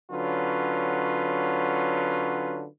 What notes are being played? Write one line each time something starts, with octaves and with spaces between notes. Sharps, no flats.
D3 F#3 C#4 F4 B4